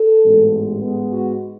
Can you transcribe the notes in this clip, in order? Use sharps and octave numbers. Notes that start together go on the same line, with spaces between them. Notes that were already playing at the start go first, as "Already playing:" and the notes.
Already playing: A4
A1 G#2 G#3 B3
G#2 G#3 B3
F#4